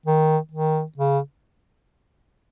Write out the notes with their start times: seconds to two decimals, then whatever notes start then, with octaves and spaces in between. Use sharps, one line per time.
0.06 D#3
0.51 D#3
0.97 C#3